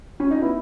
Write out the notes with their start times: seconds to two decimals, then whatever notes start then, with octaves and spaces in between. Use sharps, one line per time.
0.20 C#4
0.31 D#4
0.41 B3 E4